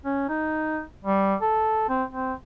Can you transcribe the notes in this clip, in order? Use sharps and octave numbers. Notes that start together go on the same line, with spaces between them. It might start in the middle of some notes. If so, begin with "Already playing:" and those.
C#4
D#4
G3
A4
C4
C4